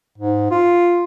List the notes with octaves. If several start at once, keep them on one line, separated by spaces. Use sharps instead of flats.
G#2
F4